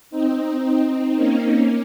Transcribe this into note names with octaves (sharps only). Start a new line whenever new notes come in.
C4 D#4
C4 D#4
A#3 C#4
A#3 C#4